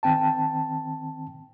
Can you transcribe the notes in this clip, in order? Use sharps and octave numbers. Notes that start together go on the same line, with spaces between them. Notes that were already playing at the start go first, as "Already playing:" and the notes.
D#3 C4 G5 A5